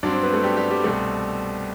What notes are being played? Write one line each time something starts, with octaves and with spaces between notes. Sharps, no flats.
G2 F#3 C4 D4 D5
C4 C5
B3 B4
A3 A4
G3 G4
G3 G4
G3 G4
C2 B2 G3 A3 C4 A4